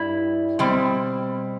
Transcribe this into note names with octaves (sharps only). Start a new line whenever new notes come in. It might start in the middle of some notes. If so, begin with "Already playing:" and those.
Already playing: G2 G3 E4
B2 G3 C4